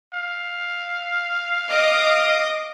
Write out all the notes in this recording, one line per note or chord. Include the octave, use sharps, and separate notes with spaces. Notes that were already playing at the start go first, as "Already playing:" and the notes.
F5
D#5 D6 D#6